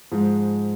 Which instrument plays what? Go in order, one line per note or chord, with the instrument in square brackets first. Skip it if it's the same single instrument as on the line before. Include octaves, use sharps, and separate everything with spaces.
[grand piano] G#2 F3 G#3